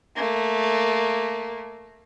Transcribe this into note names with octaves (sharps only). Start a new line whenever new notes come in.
A3 A#3